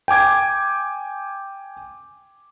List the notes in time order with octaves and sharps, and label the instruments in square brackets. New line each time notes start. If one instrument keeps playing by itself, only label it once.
[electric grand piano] G5 G#5 D6 G#6